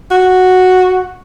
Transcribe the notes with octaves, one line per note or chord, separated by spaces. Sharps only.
F#4